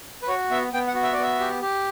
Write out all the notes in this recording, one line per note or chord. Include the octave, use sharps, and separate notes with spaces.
B4
F#4 C#5
B3 E5
B3 G5
F#5
F#4
E5
D5
B3 E5
G4
G4